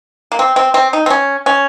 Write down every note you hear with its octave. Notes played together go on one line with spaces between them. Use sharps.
A#3
C4
C4
C4
D#4
C4
C#4
C#4